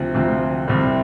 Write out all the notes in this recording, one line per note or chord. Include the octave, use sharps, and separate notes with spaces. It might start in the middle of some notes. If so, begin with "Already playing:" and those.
Already playing: D2 C3 F3 C4
D2 C3 F3 C4
C2 C3 G3 C4